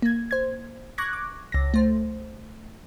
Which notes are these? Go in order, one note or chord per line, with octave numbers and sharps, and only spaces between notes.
A#3 G#6
C5 G#6
C#6 D6 F#6 G#6 A#6
D6
C#2 A#6
A3 C5